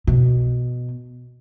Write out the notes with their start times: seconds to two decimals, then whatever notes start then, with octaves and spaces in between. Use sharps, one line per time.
0.07 B2